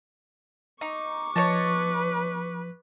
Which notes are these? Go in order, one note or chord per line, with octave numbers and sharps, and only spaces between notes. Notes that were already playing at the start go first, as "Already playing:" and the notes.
D#4 C#6 D6
F3 B4 C#5 D#5 A5